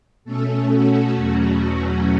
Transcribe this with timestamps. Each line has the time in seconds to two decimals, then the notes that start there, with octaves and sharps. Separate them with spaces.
0.25 B2 A3 C#4 A4
0.71 F#4
1.15 E2 B2 F#3 A3 C#4